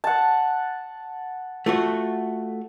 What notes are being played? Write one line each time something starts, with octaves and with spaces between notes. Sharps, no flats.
F#5 A5
A3 F4 F#4